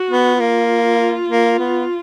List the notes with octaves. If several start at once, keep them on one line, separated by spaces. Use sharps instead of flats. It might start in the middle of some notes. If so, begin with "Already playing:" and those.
Already playing: F#4
B3
A#3 F4
A#3
B3